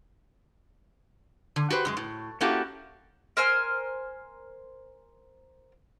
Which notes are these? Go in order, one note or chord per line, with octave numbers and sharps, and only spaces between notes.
D3
F#4 G4 B4 C5
F#2 F#3 G#3
A2
A#3 C#4 E4 F#4 G4 A4
A#4 C5 G#5 F6